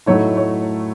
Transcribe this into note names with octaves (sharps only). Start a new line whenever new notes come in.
A2 F#3 A3 D#4 C#5
C#5